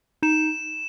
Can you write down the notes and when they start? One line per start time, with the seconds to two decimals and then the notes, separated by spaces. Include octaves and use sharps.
0.23 D#4 E7